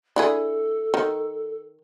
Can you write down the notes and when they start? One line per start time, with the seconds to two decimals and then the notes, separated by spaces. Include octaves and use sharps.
0.16 D4 E4 G#4 A4
0.94 D#3